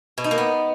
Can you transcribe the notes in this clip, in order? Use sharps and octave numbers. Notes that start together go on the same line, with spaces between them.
B2
D#4
A#3
B3